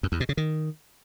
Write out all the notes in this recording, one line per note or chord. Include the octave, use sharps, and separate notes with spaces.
F#2
E2
B2
C#3
D#3